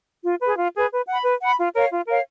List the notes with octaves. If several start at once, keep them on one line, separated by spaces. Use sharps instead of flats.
F4
B4
G#4
F4
G#4 B4
B4
F#5 B5
B4
F#5 B5
F4
A#4 C#5 F5
F4
A#4 C#5 F5